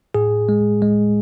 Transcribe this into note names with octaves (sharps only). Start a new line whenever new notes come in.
A2 G#4
G#3
G#3